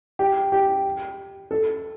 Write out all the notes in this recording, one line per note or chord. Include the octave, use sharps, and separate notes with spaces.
G4
G4
A4